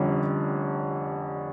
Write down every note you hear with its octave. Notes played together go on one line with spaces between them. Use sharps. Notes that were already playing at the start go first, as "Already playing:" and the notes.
Already playing: F1 F2 D3 G3 C#4